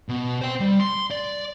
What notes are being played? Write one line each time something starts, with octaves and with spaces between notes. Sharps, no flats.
B2
C5 G5
G3
C6
D5